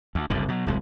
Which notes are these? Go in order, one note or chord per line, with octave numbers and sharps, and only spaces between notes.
D2
F#1 C2 G2 D3
B2 F#3
D1 C2 G#3